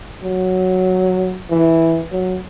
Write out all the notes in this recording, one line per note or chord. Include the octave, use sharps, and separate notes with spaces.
F#3
E3
F#3